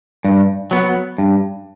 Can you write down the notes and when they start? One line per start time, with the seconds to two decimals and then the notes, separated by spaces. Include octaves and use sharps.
0.25 G2
0.71 F#3 B3
1.18 G2